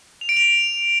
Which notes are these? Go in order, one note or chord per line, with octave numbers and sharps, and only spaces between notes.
F7
D7
F7